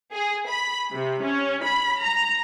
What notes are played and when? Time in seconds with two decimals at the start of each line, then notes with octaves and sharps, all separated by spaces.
0.13 G#4
0.48 B5
0.93 C3
1.23 C#4
1.65 B5
2.01 A#5